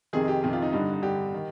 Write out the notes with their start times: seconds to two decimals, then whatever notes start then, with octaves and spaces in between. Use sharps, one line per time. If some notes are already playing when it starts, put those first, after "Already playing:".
0.13 F2 C3 D#3 G#4
0.28 G4
0.44 F2 C3 D#3 G4
0.53 F4
0.62 D#4
0.73 G2 D3 D#4
0.94 D#4
1.02 G2 D3 G4
1.34 D#3